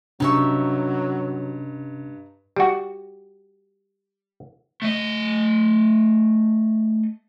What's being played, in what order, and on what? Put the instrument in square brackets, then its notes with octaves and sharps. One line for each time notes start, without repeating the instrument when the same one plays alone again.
[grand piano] G2 [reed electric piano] C3 C#4 [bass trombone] F#3 [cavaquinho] D#4 E5 C#6
[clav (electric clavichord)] G3 F#4
[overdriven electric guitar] A3 D#5